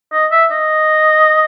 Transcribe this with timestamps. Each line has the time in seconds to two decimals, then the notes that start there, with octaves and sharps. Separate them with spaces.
0.13 D#5
0.32 E5
0.51 D#5